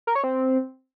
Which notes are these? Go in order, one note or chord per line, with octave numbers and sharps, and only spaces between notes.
A#4
C#5
C4